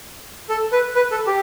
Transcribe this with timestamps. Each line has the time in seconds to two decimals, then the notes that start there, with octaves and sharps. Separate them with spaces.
0.49 A4
0.72 B4
0.95 B4
1.11 A4
1.27 G4